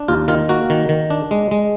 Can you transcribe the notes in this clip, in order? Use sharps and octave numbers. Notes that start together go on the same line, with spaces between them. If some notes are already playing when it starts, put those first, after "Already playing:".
Already playing: D4
D#2 F4
D#3 F4
A#3 F#4
D#3
D#3
D4
G#3
G#3